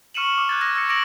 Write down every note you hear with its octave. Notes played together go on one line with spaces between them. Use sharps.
C#6 F6 C#7 D#7 E7 F#7
D6
F#6 G#6 A6
D6 E6 G#6 A#6
E6 G#6 A#6 C#7
D6 A#6 D7 E7 F#7